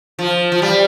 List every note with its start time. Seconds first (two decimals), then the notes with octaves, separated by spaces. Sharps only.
0.19 F3
0.52 F3
0.62 G3